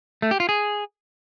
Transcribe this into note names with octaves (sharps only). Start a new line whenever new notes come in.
A3
G4
F4
G#4